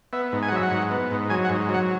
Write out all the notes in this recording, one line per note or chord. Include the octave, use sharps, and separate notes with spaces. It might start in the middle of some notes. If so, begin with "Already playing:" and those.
B3 E5
G#2
G#5
F#5
F#3 E5
F#5
G#2
B3
G#2
F#3 G#5
F#5
G#2
F#3
F#5